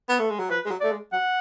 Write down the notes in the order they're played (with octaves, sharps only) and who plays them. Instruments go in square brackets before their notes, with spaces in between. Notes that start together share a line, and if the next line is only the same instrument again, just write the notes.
[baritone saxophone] B3
A3
G#3
F#3
[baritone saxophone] F3 [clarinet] B4
[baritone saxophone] G#3
F#3
[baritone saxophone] A3 [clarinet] D5
[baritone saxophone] G#3
[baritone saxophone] F#3 [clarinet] F#5